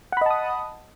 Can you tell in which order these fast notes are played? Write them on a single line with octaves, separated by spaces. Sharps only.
F#5 B5 D#5 A5 D#6